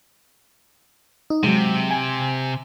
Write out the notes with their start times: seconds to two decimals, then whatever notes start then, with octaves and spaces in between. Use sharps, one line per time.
1.30 D#4
1.44 C3 F#3 G#3
1.91 G#5